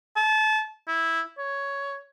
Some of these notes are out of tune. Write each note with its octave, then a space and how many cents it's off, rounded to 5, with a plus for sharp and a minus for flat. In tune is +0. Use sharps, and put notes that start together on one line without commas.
A5 -30
E4 -5
C#5 +10